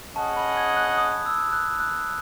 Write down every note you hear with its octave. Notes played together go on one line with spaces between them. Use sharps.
C#4 G#4 D#5 F#5 A5
B5
G#6
F#6
D#6
E6
F#6
F#6